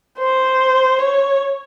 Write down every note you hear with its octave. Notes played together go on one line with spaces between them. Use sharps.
C5
C#5